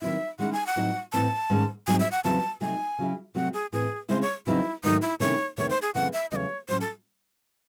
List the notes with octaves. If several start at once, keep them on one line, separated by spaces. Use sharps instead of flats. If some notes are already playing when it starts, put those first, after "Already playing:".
D#3 F#3 C4 E4 E5
D#3 G#3 C#4 E4 F#5
G#5
F#5
A2 F#3 C4 D#4
A2 E3 C4 A5
G#2 D#3 G#3 C#4
G#2 F#3 C4 D#4 G#5
E5
F#5
E2 C#3 F#3 C4 E4 A5
C3 F#3 A3 D#4 G#5
C#3 F#3 C#4 E4
C3 F#3 A3 C4 F#5
G#4
A2 E3 C4 G#4
C#3 G#3 C4 E4 C5
C#5
E2 C#3 F#3 C4 D#4 E4
G#2 D#3 F#3 A3 D#4
E4
C3 D#3 A3 C#4 E4 C#5
E2 C3 D#3 A3 C#5
C5
G#4
F#2 C#3 E3 A3 C4 F#5
E5
E2 C#3 F#3 A3 C#5 D#5
A2 F#3 C#4 C5
A4